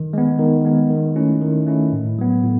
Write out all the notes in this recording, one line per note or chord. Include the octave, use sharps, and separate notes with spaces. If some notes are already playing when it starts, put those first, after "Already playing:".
Already playing: D#3
G#3 B3
D#3
G#3 B3
D#3
A3 C#4 E4
D#3
A3 C#4 E4
A2
F#3 B3
A2